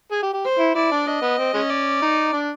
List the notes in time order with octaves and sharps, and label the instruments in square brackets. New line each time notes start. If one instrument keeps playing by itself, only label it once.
[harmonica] G#4
G4
G4
[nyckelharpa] C5
[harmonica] E4
[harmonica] E4 [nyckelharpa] D5
[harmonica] D4
[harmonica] D4 [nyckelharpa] D#5
[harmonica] B3
C4
G#3 C#4
[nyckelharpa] D5
[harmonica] D#4
D4